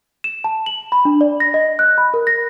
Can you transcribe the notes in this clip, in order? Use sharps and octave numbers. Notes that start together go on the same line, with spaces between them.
E7
A5
F#7
B5
D4
D5
A#6
D#5
F#6
B5
A#4
A#6